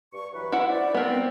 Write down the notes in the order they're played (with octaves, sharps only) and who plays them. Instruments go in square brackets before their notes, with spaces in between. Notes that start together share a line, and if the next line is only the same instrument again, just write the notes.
[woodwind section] G2 C#6
E3 F#3 B4
[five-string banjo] E4 F#5
[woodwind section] C5 D5
[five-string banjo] B3 A#4 [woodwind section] C4